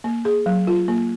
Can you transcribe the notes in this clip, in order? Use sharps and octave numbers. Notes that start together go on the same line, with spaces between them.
A#3
G#4
F#3
F4
A#3